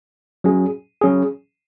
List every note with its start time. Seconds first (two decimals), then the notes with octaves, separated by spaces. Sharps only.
0.44 F#3 C#4 G#4
1.01 F#3 C#4 G#4